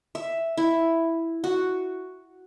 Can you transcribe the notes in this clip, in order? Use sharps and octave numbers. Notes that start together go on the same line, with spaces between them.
E5
E4
F#4